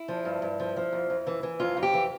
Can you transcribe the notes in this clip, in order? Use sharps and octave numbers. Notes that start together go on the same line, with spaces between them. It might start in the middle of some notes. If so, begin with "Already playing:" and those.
Already playing: E4
F3
G2
G2
F3
F3
F2
F2
E3
E3
F2 F4
F2
G4
E3